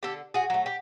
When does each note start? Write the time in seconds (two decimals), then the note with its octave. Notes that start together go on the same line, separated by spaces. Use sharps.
0.03 D3 G4 A4
0.34 F#4 G#4
0.50 F#3 A3
0.66 G4